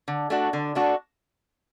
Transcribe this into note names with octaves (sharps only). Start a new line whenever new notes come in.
D3
A3 D4 F#4
D3
A3 D4 F#4